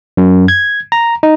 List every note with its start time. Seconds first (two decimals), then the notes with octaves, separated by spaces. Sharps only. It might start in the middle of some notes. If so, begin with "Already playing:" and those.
0.17 F#2
0.48 G#6
0.92 A#5
1.23 D#4